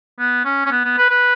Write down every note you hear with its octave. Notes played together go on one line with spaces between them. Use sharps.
B3
C#4
C#4
B3
B3
B4
B4